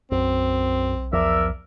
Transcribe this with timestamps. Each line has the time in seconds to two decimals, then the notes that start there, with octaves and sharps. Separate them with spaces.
0.12 B1 F#2 C4
1.13 E2 F3 A#4 D5 E5